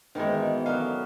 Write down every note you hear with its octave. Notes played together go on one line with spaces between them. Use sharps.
G#2 B2 D#3 E3 G#3 C5 D#5 G5
F#3 C#4 A4 A#4 D5 F5 D#6